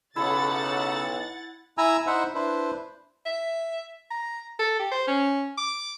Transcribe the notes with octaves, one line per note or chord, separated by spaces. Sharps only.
B1 C#3 E4 A4 F#5 E6 A6
E4 G#5 A#5 E6
D#4 E4 C5 E5 F#5
D4 E4 B4 C5
E5
A#5
A4
G4
C5
C#4
D6